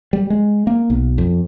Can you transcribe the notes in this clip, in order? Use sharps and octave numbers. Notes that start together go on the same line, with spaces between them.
G3
G#3
A#3
B1
F2